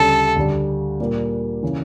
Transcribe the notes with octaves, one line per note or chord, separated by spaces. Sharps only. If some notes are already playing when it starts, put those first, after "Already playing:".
Already playing: D2 C#3 G3 A4
D2 D3 G3
A#2 G3 A#3
C#3 E3